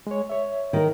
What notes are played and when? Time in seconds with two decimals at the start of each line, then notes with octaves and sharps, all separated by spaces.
0.07 G#3 C#5
0.29 C#5 E5
0.73 D#3 A#4